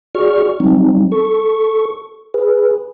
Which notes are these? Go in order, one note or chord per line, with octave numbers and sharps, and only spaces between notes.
F#4 G#4 D5 C#6 F6
F#3 G3 C4 D#4
A4 C#6
G#4 B4